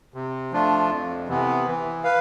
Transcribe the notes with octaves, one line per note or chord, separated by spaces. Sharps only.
C3
F3 A3 D4 F4
F2
C3 E3 B3
E3
B4 F5